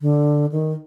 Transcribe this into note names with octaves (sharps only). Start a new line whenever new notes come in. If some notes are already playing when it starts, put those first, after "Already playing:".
D3
D#3